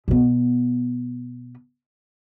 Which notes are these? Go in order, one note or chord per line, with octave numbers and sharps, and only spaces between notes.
B2 B3